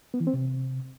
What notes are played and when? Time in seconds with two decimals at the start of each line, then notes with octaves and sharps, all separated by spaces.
0.14 B3
0.20 E3
0.27 C4
0.34 C3